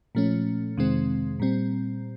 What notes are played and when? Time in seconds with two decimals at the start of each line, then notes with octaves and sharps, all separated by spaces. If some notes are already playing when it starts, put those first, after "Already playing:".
0.15 A#2 F3 A3 C#4
0.77 F2 C3 D#3 G#3 C4
1.40 A#2 G3 C4